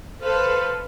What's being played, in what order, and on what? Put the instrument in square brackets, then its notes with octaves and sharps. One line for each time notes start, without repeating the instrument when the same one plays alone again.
[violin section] A4 B4 [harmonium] C5 [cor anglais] F5